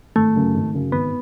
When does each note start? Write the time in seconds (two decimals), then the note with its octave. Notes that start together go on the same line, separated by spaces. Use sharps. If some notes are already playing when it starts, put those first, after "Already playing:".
0.15 G#1 A3
0.35 F#2 C#3 F#3
0.55 G#1
0.74 F#2 C#3 F#3
0.92 G#1 B3